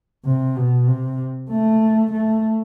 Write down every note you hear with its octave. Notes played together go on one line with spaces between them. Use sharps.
C3
B2
C3
A3
A3